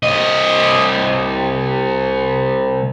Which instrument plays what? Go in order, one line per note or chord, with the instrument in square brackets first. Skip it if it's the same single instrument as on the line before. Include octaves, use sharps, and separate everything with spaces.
[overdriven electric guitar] C2 D#5